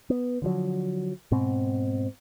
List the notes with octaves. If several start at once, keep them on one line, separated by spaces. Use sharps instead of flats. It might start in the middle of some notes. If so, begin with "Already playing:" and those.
B3
D3 F3 F#3
G#2 B2 C4